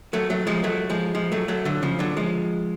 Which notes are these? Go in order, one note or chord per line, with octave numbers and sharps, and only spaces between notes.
F#3 A3
F#3 A3
F3 G#3
F#3 A3
F3 G#3
F3 G#3
F#3 A3
F#3 A3
D3 F#3
C#3 F3
D3 F#3
F3 G#3